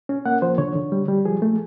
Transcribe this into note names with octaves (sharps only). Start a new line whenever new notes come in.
C#4
A#3 F#5
F3 C5
D3 C#5
D3
G3
G3
F3 G#4
A3